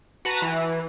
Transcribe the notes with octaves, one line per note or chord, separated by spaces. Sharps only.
F#4 B4 A5 A#5
E3